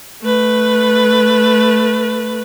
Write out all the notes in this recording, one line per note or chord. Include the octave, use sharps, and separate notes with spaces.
A3 B4